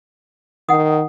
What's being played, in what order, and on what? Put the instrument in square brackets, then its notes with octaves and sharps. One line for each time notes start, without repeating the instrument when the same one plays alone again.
[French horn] D#3 [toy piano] F#5 D#6